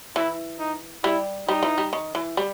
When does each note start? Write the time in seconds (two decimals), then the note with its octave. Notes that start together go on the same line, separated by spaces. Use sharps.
0.16 E3 E4
0.59 D#4
1.04 G3 E4
1.48 G3 D#4
1.63 E3
1.78 G3
1.93 D#3
2.15 E3
2.37 G3